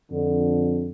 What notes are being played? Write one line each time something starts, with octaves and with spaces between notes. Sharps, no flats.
F2 D3